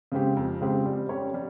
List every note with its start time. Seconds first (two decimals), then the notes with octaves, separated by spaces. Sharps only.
0.12 C#3 G#3 C4 G4
0.37 F2
0.61 C#3 G#3 C4 G4
0.85 G3
1.09 C#4 G4 C#5
1.34 G3